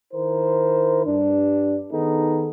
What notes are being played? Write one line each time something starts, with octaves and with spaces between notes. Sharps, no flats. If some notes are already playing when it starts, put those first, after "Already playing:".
D#3 E4 A#4 C5
G2 D4
D#3 B3 D#4 G#4 A4